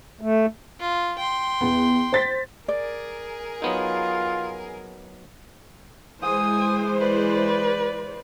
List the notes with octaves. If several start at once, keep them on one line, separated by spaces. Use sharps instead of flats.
A3
F4
G5 C6
E2 B3
C5 A6 B6
G#4 A#4 D5
F#3 B3 D#4 F4
E3 G#3 C5 G#5 D#6
B4 D5